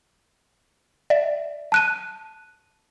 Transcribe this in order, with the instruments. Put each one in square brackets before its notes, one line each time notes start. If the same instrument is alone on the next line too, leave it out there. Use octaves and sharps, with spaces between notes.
[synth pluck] D5 E5
[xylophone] A5 F#6 D#7